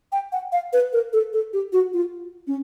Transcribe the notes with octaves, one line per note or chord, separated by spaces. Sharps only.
G5
F#5
F5
B4
A#4
A4
A4
G4
F#4
F4
C#4